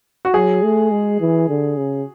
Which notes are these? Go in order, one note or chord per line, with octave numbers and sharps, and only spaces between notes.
F#4
F#3 G#4
A3
G#3
E3
D3
C#3